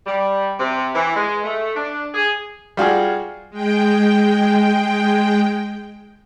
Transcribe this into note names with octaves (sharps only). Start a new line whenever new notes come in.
G3
C3
E3
G#3
A3
D4
G#4
G3 F4 F#4 G#4
G#3 G5